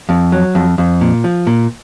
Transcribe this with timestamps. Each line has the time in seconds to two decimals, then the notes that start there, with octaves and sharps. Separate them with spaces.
0.09 F2
0.32 F#3
0.55 F2
0.78 F2
1.01 A#2
1.24 F3
1.47 A#2